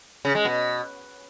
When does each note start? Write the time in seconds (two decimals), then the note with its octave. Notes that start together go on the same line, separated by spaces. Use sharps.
0.25 C#3
0.35 G#3
0.45 B2